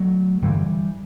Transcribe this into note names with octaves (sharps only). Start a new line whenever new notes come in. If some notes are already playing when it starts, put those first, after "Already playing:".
Already playing: F#3 A3
G2 D3 E3 G3